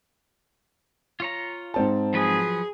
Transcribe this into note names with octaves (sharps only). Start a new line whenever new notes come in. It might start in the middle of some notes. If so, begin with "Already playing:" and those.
F4 C#5 A#5
G#2 C4 A5
F3 F#3 G#4 B4